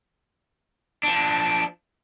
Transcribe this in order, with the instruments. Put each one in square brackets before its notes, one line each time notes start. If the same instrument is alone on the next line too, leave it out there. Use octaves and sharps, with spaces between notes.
[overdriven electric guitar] F3 D4